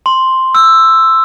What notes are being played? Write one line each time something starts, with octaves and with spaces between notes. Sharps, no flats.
C6
E6